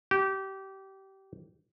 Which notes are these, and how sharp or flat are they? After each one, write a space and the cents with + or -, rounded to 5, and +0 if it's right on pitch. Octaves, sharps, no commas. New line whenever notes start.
G4 -25